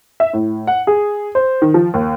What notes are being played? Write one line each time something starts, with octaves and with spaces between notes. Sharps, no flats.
E5
A2
F#5
G#4
C5
D#3
F3
D#2